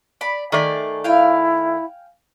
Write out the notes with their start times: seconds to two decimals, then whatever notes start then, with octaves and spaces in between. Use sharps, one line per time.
0.21 D5 B5
0.52 D#3 A3 G#4 D5
1.04 E4 F5 G5 G#5